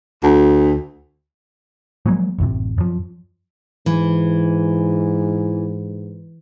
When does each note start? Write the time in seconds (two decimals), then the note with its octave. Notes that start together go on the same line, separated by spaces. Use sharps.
0.23 D2
2.06 F3 F#3 G#3 A#3
2.38 A1 F#2 C3
2.78 F#2 F3
3.86 G#2 E3